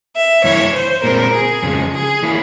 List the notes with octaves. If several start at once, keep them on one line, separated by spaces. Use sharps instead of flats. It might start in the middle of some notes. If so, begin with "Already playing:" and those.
E5
G2 E3 A#3 E4 C#5
C5
A#2 G#3 C4 A#4
G#4
F2 C#3 F3 G#3
G#4
E3 A#3 E4